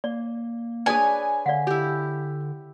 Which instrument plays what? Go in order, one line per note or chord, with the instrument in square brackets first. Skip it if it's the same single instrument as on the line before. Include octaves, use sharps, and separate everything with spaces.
[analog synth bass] A#3 [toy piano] D5
[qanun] D4 B4 C#5 [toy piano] G#4 D#6 [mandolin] G#5
[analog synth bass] D3 [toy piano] D5 F5 F#5
[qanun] E4 G4